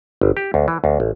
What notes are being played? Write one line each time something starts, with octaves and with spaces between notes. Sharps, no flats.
G1
G4
D2
E3
D2
A1